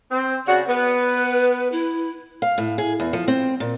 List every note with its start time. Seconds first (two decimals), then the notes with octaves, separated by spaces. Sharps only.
0.11 C4
0.47 C#3 F#4 D5
0.68 B3 B4
1.72 E4
2.42 F5
2.58 A2
2.78 G#4
3.00 E2
3.13 F3
3.28 C4
3.60 A#2